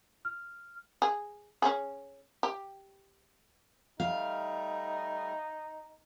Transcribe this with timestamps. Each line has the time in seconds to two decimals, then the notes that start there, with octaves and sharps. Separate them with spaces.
0.25 F6
1.02 G#4
1.62 C#4 G#4
2.43 G4
4.00 G3 A3 D#4 F5